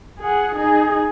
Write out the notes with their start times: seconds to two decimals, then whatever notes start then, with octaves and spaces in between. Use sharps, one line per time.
0.19 G#4 F#5
0.55 D#4 G#4